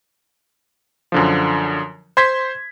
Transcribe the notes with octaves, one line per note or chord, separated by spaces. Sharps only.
F#2 D3 F3
C5 C6 G#6 B6